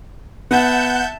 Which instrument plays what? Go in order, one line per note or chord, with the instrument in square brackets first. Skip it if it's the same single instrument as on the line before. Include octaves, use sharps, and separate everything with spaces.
[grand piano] B3 [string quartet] E5 A5 [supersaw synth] F#5 G6